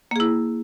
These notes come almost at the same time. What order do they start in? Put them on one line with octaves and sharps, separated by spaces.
A#3 G#4 E4